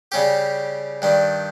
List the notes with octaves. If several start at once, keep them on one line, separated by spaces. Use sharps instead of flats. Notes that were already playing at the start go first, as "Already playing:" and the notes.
C#3 G3 C#4 G4
G2 D#3 G3